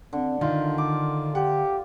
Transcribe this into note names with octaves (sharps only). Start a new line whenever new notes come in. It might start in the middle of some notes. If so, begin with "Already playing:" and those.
D3 C4
D3 D#3 F4
D6
G4 F#5